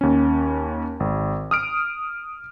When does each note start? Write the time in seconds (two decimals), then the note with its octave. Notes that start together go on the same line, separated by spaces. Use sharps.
0.01 D#2 C#4
1.00 G#1
1.51 D#6 F6 D7